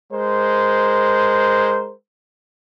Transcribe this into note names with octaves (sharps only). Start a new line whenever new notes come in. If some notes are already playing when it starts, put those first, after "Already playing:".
G#3 A#4 C5